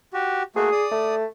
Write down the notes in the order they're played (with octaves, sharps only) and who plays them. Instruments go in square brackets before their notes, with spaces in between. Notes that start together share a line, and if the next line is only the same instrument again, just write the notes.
[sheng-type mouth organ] F#4 G4
[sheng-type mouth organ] A3 A#3 F#4 [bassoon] G#4
[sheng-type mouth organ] D5 D#6
[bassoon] A3